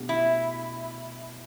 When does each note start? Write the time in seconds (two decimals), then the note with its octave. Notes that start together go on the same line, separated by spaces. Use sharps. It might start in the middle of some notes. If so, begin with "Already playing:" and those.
Already playing: B2 A3 D4 G4
0.09 E4